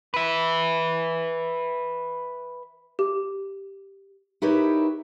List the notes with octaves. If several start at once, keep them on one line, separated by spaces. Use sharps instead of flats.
B4 E5
G4
D#4 E4 G4 A#4 B4 C#5